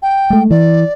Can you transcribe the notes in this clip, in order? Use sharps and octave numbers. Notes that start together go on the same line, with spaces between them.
G5
G#3 A3
E3 D5